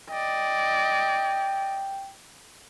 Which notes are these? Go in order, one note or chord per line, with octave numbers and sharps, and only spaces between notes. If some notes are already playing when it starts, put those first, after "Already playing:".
D5 D#5 G5